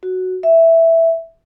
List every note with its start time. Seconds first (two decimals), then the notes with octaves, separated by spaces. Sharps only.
0.03 F#4
0.43 E5